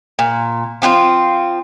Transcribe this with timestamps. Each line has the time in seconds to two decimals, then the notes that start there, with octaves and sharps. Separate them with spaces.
0.19 A#2
0.82 F3 C4 E4 F4